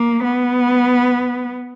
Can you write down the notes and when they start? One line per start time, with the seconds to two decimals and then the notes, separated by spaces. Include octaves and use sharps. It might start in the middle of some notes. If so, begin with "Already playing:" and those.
Already playing: A#3
0.23 B3